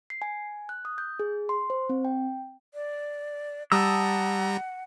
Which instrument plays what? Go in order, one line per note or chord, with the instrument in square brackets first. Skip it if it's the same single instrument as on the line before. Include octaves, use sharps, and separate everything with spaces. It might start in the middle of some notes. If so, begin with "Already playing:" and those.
[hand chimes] C7
G#5
F#6
D#6
G6
G#4
C6
C5
C4
G5
[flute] D5
[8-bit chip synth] G3 A#5 [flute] F#5 [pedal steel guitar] A5 D#6 E6